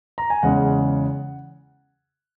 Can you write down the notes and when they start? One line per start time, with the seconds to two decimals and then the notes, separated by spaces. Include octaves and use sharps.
0.18 A#5
0.30 G#5
0.43 E2 C#3 G#3 C#4 F#5